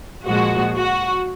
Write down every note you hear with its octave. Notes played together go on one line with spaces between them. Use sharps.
A#2 F3 G#3 F#4
F#4